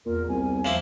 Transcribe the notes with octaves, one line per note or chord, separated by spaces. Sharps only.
E2 A#2 A#4
C2 G#5
F3 A#3 E4